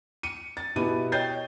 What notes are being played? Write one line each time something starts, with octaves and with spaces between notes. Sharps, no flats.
C#7 D#7
A6
B2 B3 E4 G4 D#7
C#5 D#5 G5 G6 A6 C7